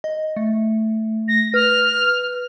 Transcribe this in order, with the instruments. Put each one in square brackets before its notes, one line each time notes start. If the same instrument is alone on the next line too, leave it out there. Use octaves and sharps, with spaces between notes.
[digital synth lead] D#5
A3
[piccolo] A#6
[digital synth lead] B4 [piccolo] F6